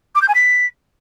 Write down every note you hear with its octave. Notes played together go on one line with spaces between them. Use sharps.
D6
G6
G#5
B6